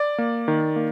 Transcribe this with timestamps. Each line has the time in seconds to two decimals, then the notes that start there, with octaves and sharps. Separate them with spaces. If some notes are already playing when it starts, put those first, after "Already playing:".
Already playing: D5
0.18 A#3
0.48 D#3
0.76 A#3